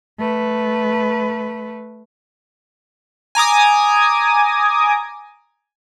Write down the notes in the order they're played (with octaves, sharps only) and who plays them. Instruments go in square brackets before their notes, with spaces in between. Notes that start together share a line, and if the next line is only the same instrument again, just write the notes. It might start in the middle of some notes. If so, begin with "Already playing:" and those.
[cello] A3 B4
[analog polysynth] G#5 A#5 D6 D#6